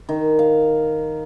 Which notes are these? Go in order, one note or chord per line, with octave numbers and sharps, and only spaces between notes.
D#3
F5